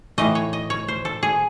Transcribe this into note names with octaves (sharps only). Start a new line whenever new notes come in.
A2 E3 A3 D#5
C#5
D#5
C#5
C5
A4
G#4